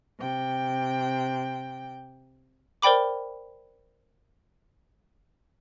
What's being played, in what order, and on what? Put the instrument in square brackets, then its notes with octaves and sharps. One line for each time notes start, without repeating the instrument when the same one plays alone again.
[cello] C3 G5
[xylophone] A#4 C5 D5 G5 B5 D6